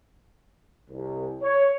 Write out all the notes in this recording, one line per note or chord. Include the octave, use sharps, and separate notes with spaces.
C2
C#5